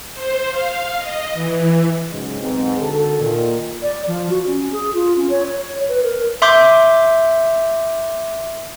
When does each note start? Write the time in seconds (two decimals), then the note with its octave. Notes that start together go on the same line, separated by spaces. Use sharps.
0.11 C5
0.50 F5
0.98 D#5
1.33 E3
2.11 G#2 C#3 F#3 G#3
2.40 B1 G#2 C4
2.80 D3 D#3 F#4 A4
3.20 A#2 D#3
3.82 D5
4.07 F3
4.30 F#4
4.46 C#4
4.72 G#4
4.94 F4
5.17 C#4
5.29 C#5
5.46 C#5
5.88 B4
6.03 A#4
6.42 E5 C6 D6 G6